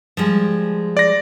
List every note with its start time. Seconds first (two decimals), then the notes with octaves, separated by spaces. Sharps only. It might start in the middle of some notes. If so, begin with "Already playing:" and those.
0.17 F3 G3 G#3
0.97 D5 A#6